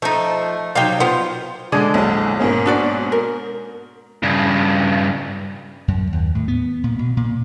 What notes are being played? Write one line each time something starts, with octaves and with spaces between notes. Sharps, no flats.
F3 A3 D#4
C3 F#3 D#4 F5 G5
B3 F4 C5
D3 G#3 G#4 D5 A5
A#1 E2 F#3
G#2 B2 A#3 C#4 A#4
D4 F#4 D5
A#4
G2 C#3
F#2
D#2
A2
B3
A#2
B2
A#2